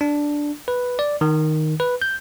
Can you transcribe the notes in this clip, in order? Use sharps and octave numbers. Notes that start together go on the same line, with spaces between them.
D4
B4
D5
D#3
B4
G6